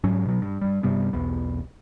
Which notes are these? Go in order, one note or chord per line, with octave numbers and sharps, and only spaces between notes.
G#2 F#3 C#4
B2 F#3
G2
G2 G3
G2 C3 G3 B3
B1 E2 B3